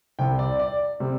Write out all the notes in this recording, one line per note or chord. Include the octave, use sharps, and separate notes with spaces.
C2 C3 G3 C4 G5
D5
D5
C3 G3 C4